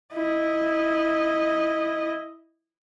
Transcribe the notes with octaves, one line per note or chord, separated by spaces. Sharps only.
E4 D#5